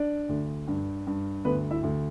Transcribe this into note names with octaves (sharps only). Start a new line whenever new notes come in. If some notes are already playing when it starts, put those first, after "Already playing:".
Already playing: D4 D5
D2
G2
G2
D2 B3 B4
E4 E5
D2